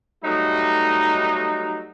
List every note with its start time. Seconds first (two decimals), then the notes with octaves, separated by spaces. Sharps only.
0.24 F#3 G3 A3 D#4